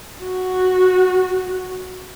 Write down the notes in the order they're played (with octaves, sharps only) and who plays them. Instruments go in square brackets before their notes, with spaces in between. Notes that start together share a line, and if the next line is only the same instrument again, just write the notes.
[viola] F#4